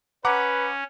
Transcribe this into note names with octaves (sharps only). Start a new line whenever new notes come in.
C#4 B4 F#5 A#5 D6